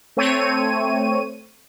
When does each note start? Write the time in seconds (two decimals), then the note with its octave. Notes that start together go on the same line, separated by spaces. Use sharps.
0.17 A3 C4 C#5 D#7